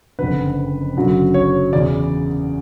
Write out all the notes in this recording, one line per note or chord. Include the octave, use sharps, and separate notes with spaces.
F#1 F2 D3 B4
F#1 F#2 D3 F#3
C#5
E2 C#3 E3 D5